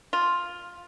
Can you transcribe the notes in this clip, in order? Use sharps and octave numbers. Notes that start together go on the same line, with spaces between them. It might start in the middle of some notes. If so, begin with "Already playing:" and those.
F4